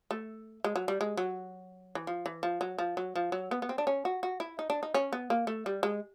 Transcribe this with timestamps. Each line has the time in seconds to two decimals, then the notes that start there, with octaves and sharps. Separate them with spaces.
0.11 A3
0.64 G#3
0.76 F#3
0.88 G3
1.01 G#3
1.17 F#3
1.95 E3
2.07 F3
2.26 E3
2.43 F3
2.61 F#3
2.78 F3
2.97 F#3
3.16 F3
3.32 F#3
3.51 B3
3.62 B3
3.69 C4
3.78 D4
3.87 C#4
4.05 F#4
4.23 F#4
4.40 E4
4.59 D#4
4.70 D4
4.83 D#4
4.94 C#4
5.13 B3
5.30 A#3
5.47 A3
5.66 G3
5.83 G#3